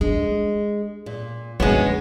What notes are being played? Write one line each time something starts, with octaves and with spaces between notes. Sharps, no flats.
G#3 D4
A#2
F#2 D3 G#3 B3 C#5